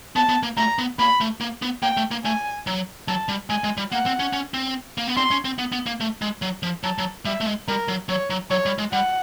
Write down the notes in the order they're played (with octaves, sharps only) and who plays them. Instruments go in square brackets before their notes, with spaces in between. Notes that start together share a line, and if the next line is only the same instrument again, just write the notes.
[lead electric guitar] B3 [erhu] A5
[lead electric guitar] B3
A#3
[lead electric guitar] A3 [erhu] A#5
[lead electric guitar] B3
[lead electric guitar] A#3 [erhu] B5
[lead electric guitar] A3
A#3
B3
[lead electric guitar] A#3 [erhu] G5
[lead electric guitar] A3
A#3
[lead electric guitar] A3 [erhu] G#5
[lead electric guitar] F#3
[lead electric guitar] F#3 [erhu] A5
[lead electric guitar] G3
[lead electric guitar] G#3 [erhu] G#5
[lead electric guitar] G#3
G3
[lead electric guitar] A#3 [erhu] F#5
[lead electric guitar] C4
C#4
C#4
C4
A#3
B3
[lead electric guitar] C4 [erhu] C6
[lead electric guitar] C#4
C4
B3
B3
A#3
A3
G#3
F#3
F3
[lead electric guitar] F#3 [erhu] A5
[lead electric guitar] F#3
[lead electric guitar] G3 [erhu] E5
[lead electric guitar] A3
G#3
[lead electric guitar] G3 [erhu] A#4
[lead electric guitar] F#3
[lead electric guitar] F#3 [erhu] C#5
[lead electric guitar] F#3
[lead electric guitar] F#3 [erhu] C#5
[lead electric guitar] G3
G#3
[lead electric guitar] G3 [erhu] F#5